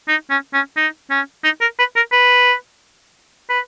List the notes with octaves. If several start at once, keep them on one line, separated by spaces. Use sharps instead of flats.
D#4
C#4
C#4
D#4
C#4
D#4
A#4
B4
A#4
B4
B4